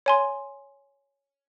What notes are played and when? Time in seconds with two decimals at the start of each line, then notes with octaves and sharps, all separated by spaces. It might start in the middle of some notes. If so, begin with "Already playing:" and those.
0.06 C#5 G#5 C6